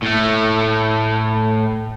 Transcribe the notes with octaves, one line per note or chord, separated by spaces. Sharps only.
A2 A3